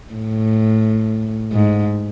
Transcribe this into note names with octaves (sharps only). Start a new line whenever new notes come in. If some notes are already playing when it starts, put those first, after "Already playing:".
A2
G#2